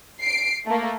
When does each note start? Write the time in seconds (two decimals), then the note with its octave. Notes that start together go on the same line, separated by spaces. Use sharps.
0.20 C7 D7
0.66 A3 A#3